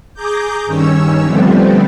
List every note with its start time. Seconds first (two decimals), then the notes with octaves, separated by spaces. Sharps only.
0.14 G#4 A#5 D6 G6
0.65 G2 D#3 C#4 C#5 E6
1.23 D3 F3 G3 A3 B3 C4